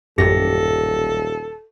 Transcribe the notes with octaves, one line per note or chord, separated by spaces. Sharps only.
D#1 A1 F#2 G4 A4 A#6